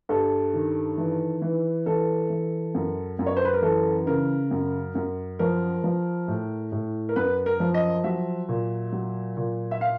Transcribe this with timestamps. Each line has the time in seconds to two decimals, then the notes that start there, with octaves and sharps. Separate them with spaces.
0.09 G2 A4
0.53 D#3
0.98 E3
1.42 E3
1.86 E3 A4
2.30 E3
2.75 F#2
3.19 F#2
3.26 C#5
3.37 C5
3.45 B4
3.54 A#4
3.62 E3 A4
4.07 C#3 A#4
4.51 F#2
4.95 F#2
5.39 F3 A#4
5.84 F3
6.28 A2
6.72 A2
7.09 A#4
7.16 F#2 B4
7.46 A#4
7.60 F3
7.74 D#5
8.04 F#3 E5
8.48 A#2
8.92 F#3
9.37 A#2
9.71 E5
9.81 F5